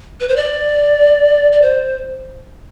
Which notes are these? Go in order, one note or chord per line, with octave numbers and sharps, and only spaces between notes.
B4
C5
D5
D5
C5